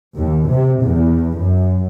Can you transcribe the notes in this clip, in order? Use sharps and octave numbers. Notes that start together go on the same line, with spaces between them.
D#2
C3
E2
F#2